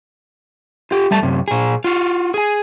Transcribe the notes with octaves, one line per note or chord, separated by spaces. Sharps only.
F4 G4
G3 A3 A5
F#2 C3
A#2 G#4
F4 F#4
G#4 G#5